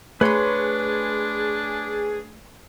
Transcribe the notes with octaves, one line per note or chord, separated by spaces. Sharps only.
A3 D4 G#4 B4 C#5 B5 C6